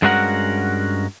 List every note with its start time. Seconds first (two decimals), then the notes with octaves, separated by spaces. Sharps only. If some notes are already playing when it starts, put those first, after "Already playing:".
0.02 G2 G#3 C#4 F#4 A#4 F#5